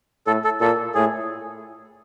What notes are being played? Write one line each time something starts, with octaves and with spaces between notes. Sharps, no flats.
A2 A4
A4
A#2 A4
A2 G#4